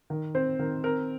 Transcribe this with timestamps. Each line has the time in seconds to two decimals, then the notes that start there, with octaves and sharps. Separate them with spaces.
0.10 D#3
0.35 C4 C5
0.59 D#3 A#4
0.84 C4 A#4